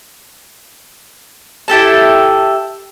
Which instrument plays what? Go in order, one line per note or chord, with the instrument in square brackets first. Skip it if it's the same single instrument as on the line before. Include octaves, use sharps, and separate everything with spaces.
[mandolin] E4 G4 A4 A5